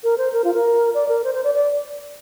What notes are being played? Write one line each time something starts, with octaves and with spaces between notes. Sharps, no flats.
A#4
C5
A#4
F4
A#4
D5
A#4
C5
C5
D5
D5